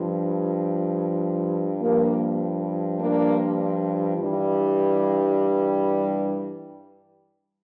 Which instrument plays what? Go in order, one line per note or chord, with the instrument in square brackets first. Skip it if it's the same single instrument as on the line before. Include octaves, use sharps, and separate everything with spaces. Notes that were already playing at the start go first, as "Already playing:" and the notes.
Already playing: [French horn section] G2 F3
G2 F3 A#3
A#3 D4
G2 E3 G3